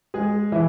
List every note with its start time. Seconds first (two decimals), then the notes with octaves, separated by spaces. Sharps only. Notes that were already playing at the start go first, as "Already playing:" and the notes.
0.14 G#3 G#4
0.52 E3 E4